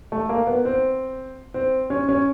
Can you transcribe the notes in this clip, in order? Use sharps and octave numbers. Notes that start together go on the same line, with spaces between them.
A3
A#3
B3
C4
C4
C#4
C#4